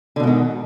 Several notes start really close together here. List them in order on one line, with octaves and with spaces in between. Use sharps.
D3 B2 G#2 D#3